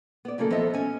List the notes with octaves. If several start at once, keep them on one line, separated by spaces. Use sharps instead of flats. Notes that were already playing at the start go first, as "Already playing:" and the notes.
B3 D5
D#2 C#3 E3 F#3 A#3 A4
F3 B3 A4 D#5 E5
C#4 G#5